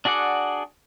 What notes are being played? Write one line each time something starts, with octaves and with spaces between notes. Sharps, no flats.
D4 F#4 G#4 D5 F#5